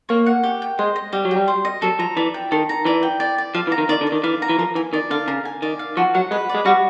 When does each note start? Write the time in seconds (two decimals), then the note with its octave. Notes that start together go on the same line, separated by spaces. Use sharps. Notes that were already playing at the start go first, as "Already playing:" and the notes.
0.09 A#3 C#5
0.26 F#5
0.44 G4
0.62 G5
0.79 G#3 C5
0.96 D#5
1.13 G3 G4
1.25 F#3
1.31 G3 G5
1.48 C5
1.65 D#5
1.82 F#3 A4
1.99 F3 A#5
2.17 E3 D5
2.34 G5
2.52 D#3 A4
2.69 A#5
2.85 E3 D5
3.03 G5
3.20 D5
3.38 D5
3.54 F3 F5
3.67 E3
3.72 A#5
3.78 D#3
3.89 D#3 D5
4.01 D3
4.07 D5
4.12 D#3
4.24 E3 F5
4.42 A#5
4.49 E3
4.58 F3 A#4
4.75 E3 G#5
4.93 D#3 D5
5.11 D3 F5
5.28 C#3 A#4
5.45 G#5
5.62 D#3 D5
5.79 F5
5.97 F3 F#4
6.15 F#3 F#5
6.31 G#3 B4
6.49 D5
6.55 G#3
6.66 G3 F#4